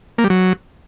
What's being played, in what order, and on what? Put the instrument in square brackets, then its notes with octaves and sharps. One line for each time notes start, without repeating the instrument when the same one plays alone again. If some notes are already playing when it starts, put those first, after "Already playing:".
[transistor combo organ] A#3
G3
F#3